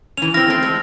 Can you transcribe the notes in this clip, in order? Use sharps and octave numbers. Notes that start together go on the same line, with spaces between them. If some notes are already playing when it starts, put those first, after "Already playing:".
E3 C#4 F7
C4 E4 F6 A#6
A3 C4
G#3